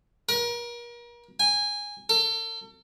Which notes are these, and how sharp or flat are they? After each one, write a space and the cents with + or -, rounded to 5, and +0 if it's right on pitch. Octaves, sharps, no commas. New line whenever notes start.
A#4 +35
G#5 -20
A4 +40